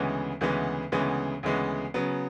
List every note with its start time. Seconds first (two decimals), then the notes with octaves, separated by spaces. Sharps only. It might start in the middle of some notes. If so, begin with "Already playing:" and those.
Already playing: D2 C#3 E3 G#3 B3
0.41 D2 C#3 E3 G#3 B3
0.92 D2 C#3 E3 G#3 B3
1.43 D2 C#3 E3 G#3 B3
1.94 C#3 F#3 B3